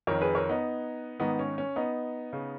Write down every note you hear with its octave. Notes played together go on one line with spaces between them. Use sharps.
F2 D#3 A#4 C#5
G#4 B4
A#4 C#5
B3 D#4
G#2 D#3 B3 D#4
C#4
C#4
B3 D#4
C#3